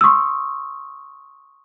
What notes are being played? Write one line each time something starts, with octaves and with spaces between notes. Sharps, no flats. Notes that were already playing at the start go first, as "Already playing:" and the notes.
C6 C#6 D#6 E6